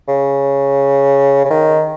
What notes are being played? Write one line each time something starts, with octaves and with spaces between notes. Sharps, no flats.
C#3
C#3
D#3